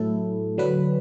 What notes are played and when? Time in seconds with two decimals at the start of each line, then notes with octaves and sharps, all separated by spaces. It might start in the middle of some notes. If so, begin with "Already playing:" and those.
Already playing: A2 F#3 A3 E4 A4
0.58 D3 F#3 D4 B4